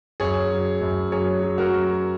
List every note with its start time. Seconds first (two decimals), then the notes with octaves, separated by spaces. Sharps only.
0.20 F#2 G#4 C#5
0.51 F#3
0.81 F#2
1.12 F#3 G#4 C#5
1.43 F#3
1.58 F#4 A#4
1.73 F#3